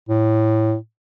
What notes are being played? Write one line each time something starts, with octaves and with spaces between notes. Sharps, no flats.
A2